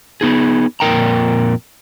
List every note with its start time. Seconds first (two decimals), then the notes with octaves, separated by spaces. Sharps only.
0.21 B3 D#4 G#4
0.80 F2 A#2 A#4 G5 A#5